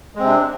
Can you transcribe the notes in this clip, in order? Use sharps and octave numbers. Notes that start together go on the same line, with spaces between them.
C3 G#3 C4 D4